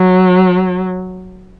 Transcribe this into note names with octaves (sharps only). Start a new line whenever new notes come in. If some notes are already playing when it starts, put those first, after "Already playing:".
Already playing: F#3